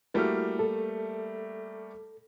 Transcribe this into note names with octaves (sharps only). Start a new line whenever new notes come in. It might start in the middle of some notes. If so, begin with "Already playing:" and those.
G3 A3 A#3 E4 F#4 F6
A4